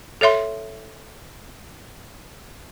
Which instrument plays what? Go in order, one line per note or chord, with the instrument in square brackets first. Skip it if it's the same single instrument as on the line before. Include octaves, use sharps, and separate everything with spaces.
[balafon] A4 C#5 E5 C6